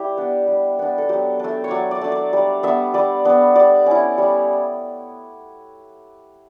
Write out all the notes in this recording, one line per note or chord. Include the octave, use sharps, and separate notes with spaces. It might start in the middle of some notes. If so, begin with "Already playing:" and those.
Already playing: G3 E4 G4
B3 D4
G3
B3 D4
A4
F#3 G4
A3 D4
C#5
F#3 D5
D5
A3 D4
D5
G3
B3 D4 E5
G3 D5
B3 D4
G3 D5
C#4 E4
G3